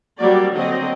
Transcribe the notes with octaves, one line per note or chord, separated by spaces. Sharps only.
F#3 G3 A#3 C4 F#4 D5
D3 F#3 A#3 C4 F#4 D#5